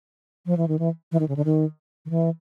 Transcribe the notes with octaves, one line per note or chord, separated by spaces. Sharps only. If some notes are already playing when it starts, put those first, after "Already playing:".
F3
E3
D#3
E3
E3
D#3
C#3
D3
D#3
D#3
E3